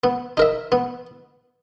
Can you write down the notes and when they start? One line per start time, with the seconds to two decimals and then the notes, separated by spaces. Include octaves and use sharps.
0.04 B3
0.37 D#4 A#4 E5
0.72 B3